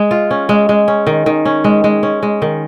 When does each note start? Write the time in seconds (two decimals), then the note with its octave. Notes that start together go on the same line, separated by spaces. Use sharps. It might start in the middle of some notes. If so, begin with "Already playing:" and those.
Already playing: G#3
0.11 F4
0.31 C#4
0.49 G#3
0.69 G#3
0.88 C#4
1.07 D#3
1.26 D#3
1.45 C#4
1.64 G#3
1.84 G#3
2.03 C#4
2.23 G#3
2.42 D#3